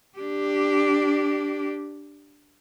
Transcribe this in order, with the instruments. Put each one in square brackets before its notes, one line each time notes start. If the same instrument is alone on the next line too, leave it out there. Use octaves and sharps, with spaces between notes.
[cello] D4 G4